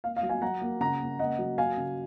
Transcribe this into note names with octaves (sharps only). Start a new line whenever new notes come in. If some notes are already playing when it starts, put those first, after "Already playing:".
A#3 F5
F5
F#3
F5 G#5
F#3 F#5 A#5
A#3
C#3 F#5 A#5
A#3
A#3 D#5 F#5
F#3
A#3 F5 G#5
C#3